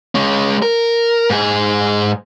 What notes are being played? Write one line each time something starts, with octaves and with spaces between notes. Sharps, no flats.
G#3 C#4
A#4
G#2 G#4